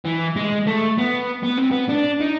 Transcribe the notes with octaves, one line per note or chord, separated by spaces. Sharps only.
E3
G#3
A3
B3
B3
C4
B3
D4
D#4